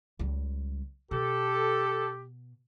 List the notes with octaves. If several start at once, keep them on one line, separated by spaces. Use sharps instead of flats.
C#2 G3
B2 G4 A4